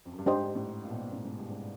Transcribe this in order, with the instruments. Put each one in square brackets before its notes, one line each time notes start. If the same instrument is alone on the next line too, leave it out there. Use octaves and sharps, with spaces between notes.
[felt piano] F2
F#2
G2
[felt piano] G#2 [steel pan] D4 G4 C5 D#5
[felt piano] A2
A#2
B2
A#2
A2
G#2
G2
G#2